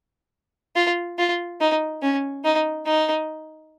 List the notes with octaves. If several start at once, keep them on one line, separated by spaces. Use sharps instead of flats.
F4
F4
D#4
C#4
D#4
D#4